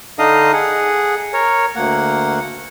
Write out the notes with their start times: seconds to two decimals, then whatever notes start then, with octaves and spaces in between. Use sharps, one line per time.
0.19 D3 D4 D#4 D#5 F5 D#6
0.53 G#4 F#5
1.33 A#4 C#5
1.76 D2 A#3 F#5